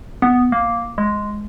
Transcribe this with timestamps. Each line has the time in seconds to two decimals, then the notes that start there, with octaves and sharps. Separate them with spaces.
0.22 B3
0.52 A#3
0.98 G#3